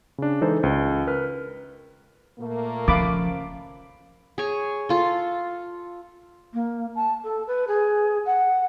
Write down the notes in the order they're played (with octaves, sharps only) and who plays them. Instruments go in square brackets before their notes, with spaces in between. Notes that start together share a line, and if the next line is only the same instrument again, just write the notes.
[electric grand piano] C#3 D4
E3 G#3 D#4 A4 C5
C#2
A#4 B4 F6
[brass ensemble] A#2 A3 A#3
[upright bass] C#3 [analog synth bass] F3 [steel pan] F5 B5 D6
[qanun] G#4 C#5
F4 A4
[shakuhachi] A#3
A5
A4
B4
G#4
F#5